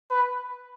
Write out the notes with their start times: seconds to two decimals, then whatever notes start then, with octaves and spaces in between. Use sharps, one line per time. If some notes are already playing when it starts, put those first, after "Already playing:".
0.10 B4